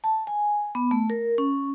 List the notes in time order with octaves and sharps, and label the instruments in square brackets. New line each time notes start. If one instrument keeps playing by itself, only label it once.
[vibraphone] A5
G#5
B3
A3
A#4
C#4